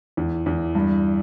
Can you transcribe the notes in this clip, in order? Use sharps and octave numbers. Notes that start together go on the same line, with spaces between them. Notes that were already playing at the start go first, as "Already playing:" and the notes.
E2
E2
G2